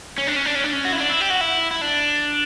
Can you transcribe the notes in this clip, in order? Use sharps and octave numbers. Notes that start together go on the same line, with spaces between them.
C#4
D4
C#4
D4
C#4
D4
C#4
F#4
E4
D4
E4
G4
F#4
E4
E4
D4